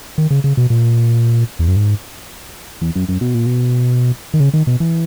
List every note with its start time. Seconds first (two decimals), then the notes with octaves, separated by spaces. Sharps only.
0.18 D#3
0.31 C#3
0.44 C#3
0.57 B2
0.70 A#2
1.59 E2
1.68 F#2
1.76 G#2
2.81 E2
2.95 F#2
3.09 F#2
3.21 B2
3.34 A#2
3.46 B2
4.34 D#3
4.40 C#3
4.54 D#3
4.67 B2
4.80 E3